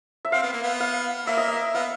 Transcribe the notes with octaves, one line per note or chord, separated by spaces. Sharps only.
E5
C4 F5
B3
A#3
B3
F5
A#3 E5
D#5
E5
B3 F5